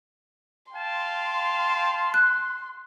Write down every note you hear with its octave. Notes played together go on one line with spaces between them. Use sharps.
F5 G5 A5 C6
F#6